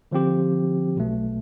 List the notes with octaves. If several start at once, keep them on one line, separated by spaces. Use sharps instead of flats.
D3 F3 C4 G4
B1 B2 A3